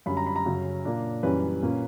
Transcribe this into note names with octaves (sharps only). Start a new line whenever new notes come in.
F#2 D3 G3 B5
A#5
B5
A#5
F#2 C#3 F#3 C#4
A#2 A#3 D4
F#2 E3 G3 C#4 B4
A#2 A#3 C#4